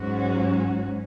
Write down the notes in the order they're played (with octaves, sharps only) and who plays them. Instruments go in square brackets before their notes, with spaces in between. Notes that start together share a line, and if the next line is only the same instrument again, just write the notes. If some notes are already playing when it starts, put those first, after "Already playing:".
Already playing: [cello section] G#2 F#3 C#4 F#4